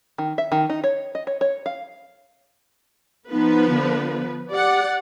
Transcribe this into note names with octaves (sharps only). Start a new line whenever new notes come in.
D#3
E5
D#3
D#4
C#5
D#5
C#5
C#5
F5
F3 B3 D#4 B4
D3
G4 D5 F#5